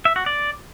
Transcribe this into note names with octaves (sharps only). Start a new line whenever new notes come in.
E5
F#4
D5